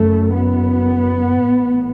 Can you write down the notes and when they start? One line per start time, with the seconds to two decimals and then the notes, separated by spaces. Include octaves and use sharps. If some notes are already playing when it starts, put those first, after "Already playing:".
Already playing: F#1 F#2 A3
0.33 B3
1.37 A1 A2